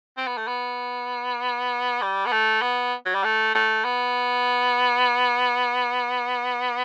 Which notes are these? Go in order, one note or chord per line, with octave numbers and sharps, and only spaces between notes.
C4
B3
A3
B3
G3
B3
A3
B3
F#3
G3
A3
A3
B3